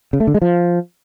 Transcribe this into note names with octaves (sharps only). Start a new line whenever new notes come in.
C#3
A3
D3
G#3
F3